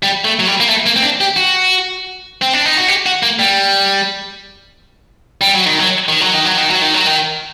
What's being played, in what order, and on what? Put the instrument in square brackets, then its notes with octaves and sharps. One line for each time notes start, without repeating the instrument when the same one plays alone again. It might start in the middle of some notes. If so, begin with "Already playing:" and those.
[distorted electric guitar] G3
A3
F#3
G3
A#3
A3
A#3
C4
D4
G4
F#4
C4
D4
D#4
F#4
G4
F#4
A#3
G3
G3
F#3
D#3
F#3
D#3
F#3
D#3
F#3
D#3
F#3
D#3
F#3
D#3